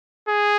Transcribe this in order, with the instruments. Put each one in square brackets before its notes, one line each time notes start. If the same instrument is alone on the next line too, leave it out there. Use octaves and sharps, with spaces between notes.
[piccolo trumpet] G#4